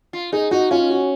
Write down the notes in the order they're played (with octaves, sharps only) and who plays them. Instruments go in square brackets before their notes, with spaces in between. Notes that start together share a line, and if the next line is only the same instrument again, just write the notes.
[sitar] F4
[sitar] D#4 [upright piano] G#4
[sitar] D#4 [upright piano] F#4
[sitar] C#4 [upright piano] F4
[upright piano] F#4